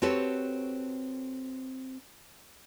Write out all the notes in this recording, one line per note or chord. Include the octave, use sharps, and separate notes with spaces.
C4 F#4 G4 A4 B4 C#5